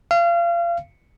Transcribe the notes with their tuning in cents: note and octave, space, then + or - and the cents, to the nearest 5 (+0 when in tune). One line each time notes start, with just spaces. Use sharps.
F5 -30